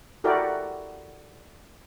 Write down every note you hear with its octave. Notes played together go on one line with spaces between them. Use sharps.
E4 F#4 G4 A4 A#4 D5